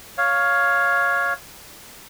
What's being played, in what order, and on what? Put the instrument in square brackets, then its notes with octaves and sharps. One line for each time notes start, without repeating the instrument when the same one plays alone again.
[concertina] C#5 F5